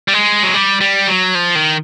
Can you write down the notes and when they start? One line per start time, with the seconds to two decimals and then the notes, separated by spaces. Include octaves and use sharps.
0.08 G3
0.14 G#3
0.43 F#3
0.54 G3
0.81 G3
1.08 F#3
1.35 F3
1.55 D#3